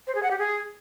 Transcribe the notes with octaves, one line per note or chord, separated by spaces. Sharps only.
C5
G#4
F#5
G4
G#4